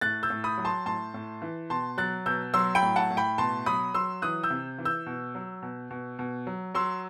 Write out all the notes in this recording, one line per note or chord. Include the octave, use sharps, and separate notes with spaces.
A2 F#6 A6
E6 G6
A2
B5 D#6
F#3
A5 C6
A2 A5 C6
A2
E3
B2 A5 C6
F#3 F#6 A6
B2 E6 G6
F#3 C6 E6
G5 B5
A2
F#5 A5
A2
G5 B5
B2 A5 C6
F#3 B5 D#6
F#3 C6 E6
E3 D#6 F#6
E6 G6
C3
E3
E6 G6
B2
F#3
B2
B2
B2
F#3
F#3 C6 E6